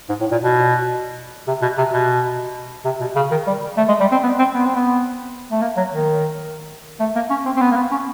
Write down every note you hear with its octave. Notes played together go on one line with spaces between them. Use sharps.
G#2
A2
A#2
B2
C3
B2
C3
B2
C3
B2
C#3
D#3
G3
A3
G#3
G3
C4
B3
C4
B3
C4
B3
A3
A#3
F#3
D#3
A3
A#3
C#4
C4
C4
B3
A#3
B3
C#4